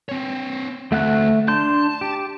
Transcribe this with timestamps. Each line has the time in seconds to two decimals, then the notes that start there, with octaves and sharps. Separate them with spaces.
0.09 C4 C#5
0.92 D2 A3 F#5 F#6
1.48 D4 A5 C6 G6
2.01 G4